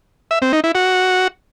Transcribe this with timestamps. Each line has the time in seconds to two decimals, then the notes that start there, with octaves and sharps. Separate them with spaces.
0.31 E5
0.42 C4
0.53 D#4
0.64 E4
0.75 F#4